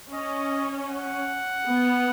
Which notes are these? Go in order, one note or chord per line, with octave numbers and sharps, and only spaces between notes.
C#4 D#5
F#5
B3